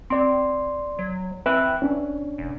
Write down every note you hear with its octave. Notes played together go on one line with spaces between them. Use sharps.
C4 D5 C6
F#3
C4 B4 E5 F#6
C#4 D4
F1